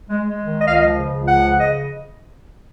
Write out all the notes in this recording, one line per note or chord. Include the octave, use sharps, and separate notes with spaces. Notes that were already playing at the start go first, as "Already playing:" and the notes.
G#3
G#3
D#3
C#2 D#5
F5
F3 D#5
C#3
C#2
F3 F#5
C#3
D#5